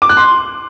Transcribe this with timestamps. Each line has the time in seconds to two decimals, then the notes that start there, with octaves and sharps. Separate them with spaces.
0.02 D6
0.09 F#6
0.17 C6